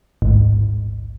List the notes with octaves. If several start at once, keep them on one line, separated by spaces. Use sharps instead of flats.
A1 D2 G#2